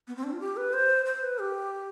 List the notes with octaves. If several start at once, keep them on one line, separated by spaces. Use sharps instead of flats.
B3
C4
D4
F4
G4
B4
C5
C5
B4
G4